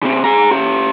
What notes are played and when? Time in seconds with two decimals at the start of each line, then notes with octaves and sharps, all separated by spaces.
0.02 C#3 C4
0.24 G#4 A#5
0.51 C#4 G4